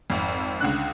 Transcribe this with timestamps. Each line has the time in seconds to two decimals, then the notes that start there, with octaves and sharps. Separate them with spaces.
0.10 G#1 F2
0.60 C#2 D3 F#6